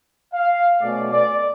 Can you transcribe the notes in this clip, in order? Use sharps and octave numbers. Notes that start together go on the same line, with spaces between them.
F5
B2 A3 C#4 D5
D5